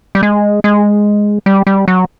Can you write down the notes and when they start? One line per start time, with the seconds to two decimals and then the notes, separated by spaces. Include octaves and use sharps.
0.15 G3
0.23 G#3
0.64 G#3
1.46 G3
1.67 G3
1.88 F#3